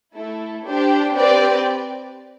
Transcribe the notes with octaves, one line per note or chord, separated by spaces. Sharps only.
A3 E4 A4
D4 G4 C5
C4 G4 B4 D5